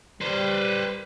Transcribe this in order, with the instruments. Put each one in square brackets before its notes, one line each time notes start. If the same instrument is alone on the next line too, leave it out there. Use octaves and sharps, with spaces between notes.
[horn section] G3 [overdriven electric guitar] B4 C5